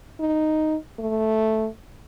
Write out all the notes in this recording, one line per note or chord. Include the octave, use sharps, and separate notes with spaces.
D#4
A3